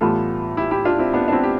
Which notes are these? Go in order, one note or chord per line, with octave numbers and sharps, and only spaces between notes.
A2 E3 G3 B3 F4 A4
E4 G4
E4 G4
D4 F4
C4 E4
B3 D4
D4
C4 E4
G4